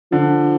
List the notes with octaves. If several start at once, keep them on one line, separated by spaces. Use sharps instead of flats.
D3 F3